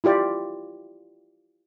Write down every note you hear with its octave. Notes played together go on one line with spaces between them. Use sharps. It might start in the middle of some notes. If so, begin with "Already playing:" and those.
E4 F4 G4 D5